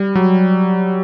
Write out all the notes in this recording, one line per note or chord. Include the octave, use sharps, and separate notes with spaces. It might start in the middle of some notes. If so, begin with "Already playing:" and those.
Already playing: G3
F#3